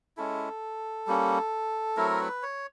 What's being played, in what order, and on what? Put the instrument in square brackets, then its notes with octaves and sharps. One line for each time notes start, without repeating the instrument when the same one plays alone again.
[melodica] G#3 C#4 E4 A4
G3 A#3 C#4
F#3 A3 C4 E4 A#4
B4
C#5